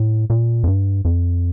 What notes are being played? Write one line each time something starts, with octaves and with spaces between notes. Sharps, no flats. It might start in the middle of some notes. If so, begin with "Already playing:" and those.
Already playing: A2
A#2
F2
G2
F2